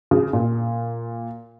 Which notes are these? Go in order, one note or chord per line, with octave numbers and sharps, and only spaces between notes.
C#3
A#2